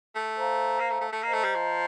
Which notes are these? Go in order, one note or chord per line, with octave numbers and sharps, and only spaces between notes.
A3
C5 F5 A#5
A#3
A3
A3
A3
A#3 C5 D#5 A#5
A3
G3
F3